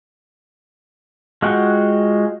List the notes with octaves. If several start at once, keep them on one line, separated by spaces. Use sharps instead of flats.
G#3 F4 F#4 F#5 G5